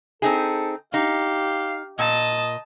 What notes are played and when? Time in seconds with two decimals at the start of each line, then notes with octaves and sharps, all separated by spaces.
0.22 C4 D#4 G#4 A4
0.94 D#4 G4 F5
1.99 A#2 D#5 A5 D#6